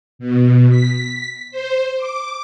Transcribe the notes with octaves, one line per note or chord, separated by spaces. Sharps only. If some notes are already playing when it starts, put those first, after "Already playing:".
B2
B6
C5
D6